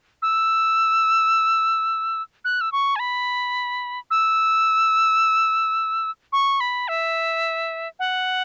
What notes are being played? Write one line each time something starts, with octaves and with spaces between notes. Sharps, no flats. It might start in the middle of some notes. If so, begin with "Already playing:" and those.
E6
F#6
E6
C#6
G#5
B5
E6
C#6
B5
E5
F#5